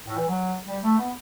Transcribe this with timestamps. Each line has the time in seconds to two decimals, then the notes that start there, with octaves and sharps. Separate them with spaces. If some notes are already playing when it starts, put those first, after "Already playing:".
0.07 A2
0.17 E3
0.28 F#3
0.67 G3
0.83 A3
0.98 B3